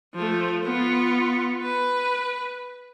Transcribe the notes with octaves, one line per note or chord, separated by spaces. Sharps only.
F3 A3
B3 F4
B4